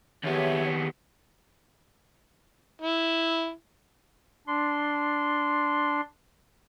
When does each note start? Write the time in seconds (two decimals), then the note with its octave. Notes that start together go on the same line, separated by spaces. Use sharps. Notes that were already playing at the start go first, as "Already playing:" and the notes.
0.23 D#2 B3 G4 G#4 C#5 E5
2.82 E4
4.47 D4 C6